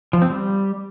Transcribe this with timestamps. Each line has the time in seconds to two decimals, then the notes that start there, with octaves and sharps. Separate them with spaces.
0.13 F3
0.22 C4
0.30 G3